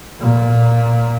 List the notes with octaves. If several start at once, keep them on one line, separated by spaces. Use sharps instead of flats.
A#2